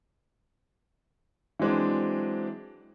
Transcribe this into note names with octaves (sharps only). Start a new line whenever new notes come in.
E3 F#3 G#3 C4 D4